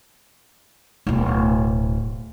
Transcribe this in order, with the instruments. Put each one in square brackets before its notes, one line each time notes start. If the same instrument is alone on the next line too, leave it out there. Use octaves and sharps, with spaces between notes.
[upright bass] D1 B2